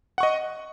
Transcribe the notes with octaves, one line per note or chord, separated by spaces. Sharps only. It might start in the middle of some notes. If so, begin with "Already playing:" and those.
D#5 F#5 C#6